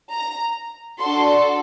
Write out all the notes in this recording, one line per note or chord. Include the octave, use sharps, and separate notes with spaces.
A#5
D4 F#4 A4 C6